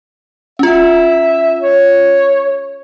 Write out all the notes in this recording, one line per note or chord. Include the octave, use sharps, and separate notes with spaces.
C#4 F4 E5
C#5